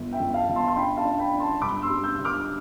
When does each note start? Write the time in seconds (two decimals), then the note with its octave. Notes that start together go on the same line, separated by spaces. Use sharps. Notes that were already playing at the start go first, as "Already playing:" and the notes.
Already playing: G1
0.13 E5 G5
0.19 G1
0.34 F5 A5
0.49 G1
0.56 A5 C6
0.68 C6
0.76 D4 G5 B5
0.97 F5 A5
1.05 D4
1.19 G5 B5
1.33 D4
1.40 A5 C6
1.61 G2 B5 D6
1.82 C6 E6
1.89 G3
2.04 E6 G6
2.19 D3
2.25 D6 F6